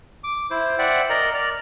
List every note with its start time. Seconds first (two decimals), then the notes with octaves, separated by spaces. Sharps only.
0.24 D6
0.51 E4 C5
0.79 C5 D5 E5 F#5 G5
1.10 A#4 D5 D#5 A#5
1.34 D5 F6